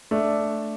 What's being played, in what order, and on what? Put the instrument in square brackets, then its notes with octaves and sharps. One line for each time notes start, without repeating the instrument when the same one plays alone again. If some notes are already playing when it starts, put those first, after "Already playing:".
[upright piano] A3 D4